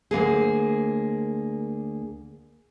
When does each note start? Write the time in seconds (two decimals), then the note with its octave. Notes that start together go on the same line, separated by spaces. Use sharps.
0.11 D2 G#2 A#3 G#4